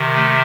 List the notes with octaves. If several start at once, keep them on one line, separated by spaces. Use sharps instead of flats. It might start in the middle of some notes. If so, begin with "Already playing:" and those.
Already playing: C3 D#3
A3